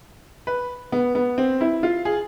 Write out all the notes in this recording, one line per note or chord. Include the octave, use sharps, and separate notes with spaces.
B4
B3
B3
C4
E4
F4
G#4